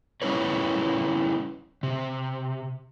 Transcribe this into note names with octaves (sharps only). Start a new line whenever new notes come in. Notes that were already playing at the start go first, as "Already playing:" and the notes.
G3 C#4 E4 B4 C#5
C3